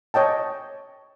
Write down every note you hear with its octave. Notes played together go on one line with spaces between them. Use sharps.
C#5 D#5 G5 A5